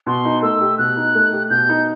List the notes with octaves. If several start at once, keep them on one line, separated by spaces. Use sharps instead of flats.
B2 C6
D#4
A3 E6
G4
B2 F#6
D#4
A3
G4
B2 G6
D#4